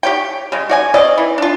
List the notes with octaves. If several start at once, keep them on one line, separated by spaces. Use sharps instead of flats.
G4 C#5 G5
C#3 G#3
F#4 D5 G#5
C4 C#4 D5 D#5
E3
D4 F4